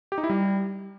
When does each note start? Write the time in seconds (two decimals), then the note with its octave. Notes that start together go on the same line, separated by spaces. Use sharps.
0.12 G4
0.18 D#4
0.24 E4
0.29 G3